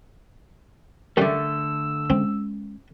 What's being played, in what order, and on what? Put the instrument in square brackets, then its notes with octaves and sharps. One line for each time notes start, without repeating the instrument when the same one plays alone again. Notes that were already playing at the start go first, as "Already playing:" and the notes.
[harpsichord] F#2 G3 [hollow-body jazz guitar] D3 A3 [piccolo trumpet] E6
[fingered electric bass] G#3 C#4 [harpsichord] C4